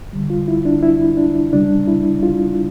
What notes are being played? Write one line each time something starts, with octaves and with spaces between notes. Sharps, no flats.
D3 G3
F4
E4
D4
E4
D4
C#3 G3 D4
E4
F4